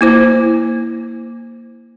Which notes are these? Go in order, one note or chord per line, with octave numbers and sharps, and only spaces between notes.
A#3 E4 C5